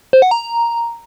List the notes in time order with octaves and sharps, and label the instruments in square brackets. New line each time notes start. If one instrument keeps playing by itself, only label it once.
[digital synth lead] C5
F#5
A#5